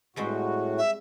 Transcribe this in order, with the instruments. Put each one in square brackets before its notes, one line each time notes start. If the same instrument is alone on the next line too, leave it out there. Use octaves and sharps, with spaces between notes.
[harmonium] A2 F#4 [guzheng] G3 G#3 C4
[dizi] E5